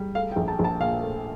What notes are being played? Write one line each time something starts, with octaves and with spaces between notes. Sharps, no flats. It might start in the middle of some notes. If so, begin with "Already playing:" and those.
Already playing: G3
A3 F5
G5
A#1
A5
A#1
A5
A#2 F5
A3